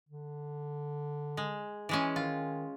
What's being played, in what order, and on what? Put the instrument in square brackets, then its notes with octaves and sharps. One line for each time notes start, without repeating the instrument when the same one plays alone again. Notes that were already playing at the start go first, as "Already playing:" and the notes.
[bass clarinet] D3
[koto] G#3
E3 G#3 C#4
[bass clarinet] D#3 [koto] F4